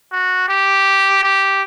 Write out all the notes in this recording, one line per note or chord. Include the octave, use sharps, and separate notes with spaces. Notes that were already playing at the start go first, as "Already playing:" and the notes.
F#4
G4
G4